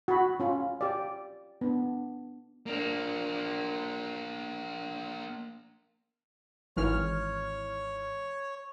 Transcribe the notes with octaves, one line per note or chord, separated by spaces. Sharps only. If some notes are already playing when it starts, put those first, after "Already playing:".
F#4 B5
C#4 F4
G4 D5
B3 D4
A#3 D4
G#1 E3 C#5 F6